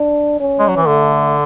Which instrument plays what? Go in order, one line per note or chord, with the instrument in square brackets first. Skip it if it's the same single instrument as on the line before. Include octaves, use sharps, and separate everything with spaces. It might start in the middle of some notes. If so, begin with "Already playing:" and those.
Already playing: [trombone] D4
C#4
[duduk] G#3
F#3
E3
[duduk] D3 [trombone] A3